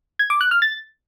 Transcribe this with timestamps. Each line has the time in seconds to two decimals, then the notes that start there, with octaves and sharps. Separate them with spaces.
0.19 G#6
0.30 D6
0.41 F#6
0.51 F6
0.62 A6